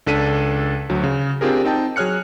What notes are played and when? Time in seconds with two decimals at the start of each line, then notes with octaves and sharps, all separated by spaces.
0.07 C#2 D4 A4 B6 D#7
0.90 D2 F#3
1.04 C#3
1.41 C4 D4 F4 G4 G#4 A#4
1.64 C4 D#4 G5 A5
1.96 F#3 G#4 C#5 F6 F#6 C#7